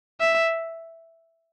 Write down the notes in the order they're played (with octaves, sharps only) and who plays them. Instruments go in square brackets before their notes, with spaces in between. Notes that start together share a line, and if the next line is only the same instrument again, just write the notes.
[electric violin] E5